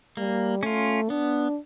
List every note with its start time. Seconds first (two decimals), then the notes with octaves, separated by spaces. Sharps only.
0.17 G3 A#3
0.63 A3 C#4 F4
1.10 B3 D4